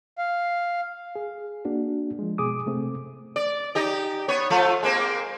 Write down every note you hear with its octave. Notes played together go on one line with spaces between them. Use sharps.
F5
G#4
A#3 D4 F#4
F3 G#3
B2 G#4 D6 D#6
C3 A3 C4
D5
D#4 G4 D#5
B3 C#5
F3 A3 F4
G#3 A#3 C4